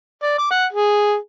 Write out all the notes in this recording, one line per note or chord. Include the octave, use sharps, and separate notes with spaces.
D5
D6
F#5
G#4